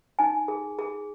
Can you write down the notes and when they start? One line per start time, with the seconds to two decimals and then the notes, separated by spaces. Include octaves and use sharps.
0.19 D#4 G#5
0.48 G#4
0.79 G#4